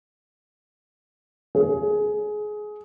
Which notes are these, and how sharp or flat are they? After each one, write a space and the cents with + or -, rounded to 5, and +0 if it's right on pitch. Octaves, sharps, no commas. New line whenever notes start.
G#4 +20